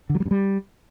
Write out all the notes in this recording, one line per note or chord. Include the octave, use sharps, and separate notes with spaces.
D3
F#3
G3
G2
G3